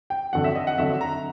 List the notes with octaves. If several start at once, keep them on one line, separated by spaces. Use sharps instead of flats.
G5
F2 D3 F#3 F#5
E5
D#5
F#5
F2 D3 F#3 E5
A#5